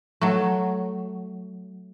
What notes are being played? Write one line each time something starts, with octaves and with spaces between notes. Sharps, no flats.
F#3 A3